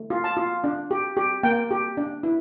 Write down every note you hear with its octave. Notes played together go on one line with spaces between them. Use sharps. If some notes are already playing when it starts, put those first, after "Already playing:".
Already playing: A3
F4
A5
F4
D4
G4
G4
A#3 G5
G4
D4
E4